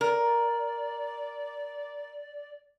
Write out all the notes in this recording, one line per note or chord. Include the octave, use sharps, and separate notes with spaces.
A#4 D5